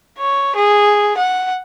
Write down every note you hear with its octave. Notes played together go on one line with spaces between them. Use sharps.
C#5
G#4
F#5